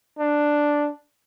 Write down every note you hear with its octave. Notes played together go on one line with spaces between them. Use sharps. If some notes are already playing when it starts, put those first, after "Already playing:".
D4